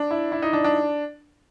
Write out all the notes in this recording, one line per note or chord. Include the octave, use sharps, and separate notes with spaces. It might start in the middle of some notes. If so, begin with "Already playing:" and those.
Already playing: D4
E4
E4
D#4
D4
D4